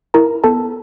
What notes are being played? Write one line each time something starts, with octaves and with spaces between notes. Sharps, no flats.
E4 A#4 A#5
B3 A4 A5